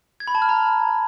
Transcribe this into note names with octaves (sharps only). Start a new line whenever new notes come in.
G#6
B5
A5
F6
A#5